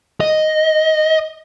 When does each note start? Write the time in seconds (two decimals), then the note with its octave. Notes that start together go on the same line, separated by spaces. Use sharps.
0.20 D#5